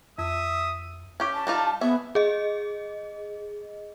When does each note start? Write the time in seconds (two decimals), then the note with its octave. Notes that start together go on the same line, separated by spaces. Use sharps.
0.18 F2 E5 D#6
1.20 C#4 G4
1.34 A5
1.47 G3 D#4 F4
1.81 B3 G#4 E5
2.15 G#4 D#5